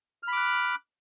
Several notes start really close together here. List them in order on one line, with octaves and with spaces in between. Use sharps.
F6 B5 D6 F#6